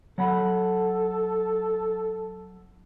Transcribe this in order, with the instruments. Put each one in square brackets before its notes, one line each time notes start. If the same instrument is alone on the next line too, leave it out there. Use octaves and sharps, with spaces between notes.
[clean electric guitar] F#3 F#5 B5 [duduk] A4